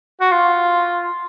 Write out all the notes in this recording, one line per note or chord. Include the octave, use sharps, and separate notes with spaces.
F#4
F4